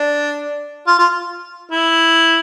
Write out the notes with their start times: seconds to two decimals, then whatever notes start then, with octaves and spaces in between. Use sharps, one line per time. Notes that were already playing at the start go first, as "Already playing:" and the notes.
Already playing: D4
0.87 F4
0.99 F4
1.72 E4